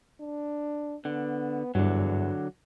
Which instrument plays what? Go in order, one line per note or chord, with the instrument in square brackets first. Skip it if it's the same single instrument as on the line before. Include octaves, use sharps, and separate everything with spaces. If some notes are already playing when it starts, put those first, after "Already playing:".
[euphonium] D4
[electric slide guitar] D3 [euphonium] B3
[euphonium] E2 [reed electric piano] G2 [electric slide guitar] D3 F#3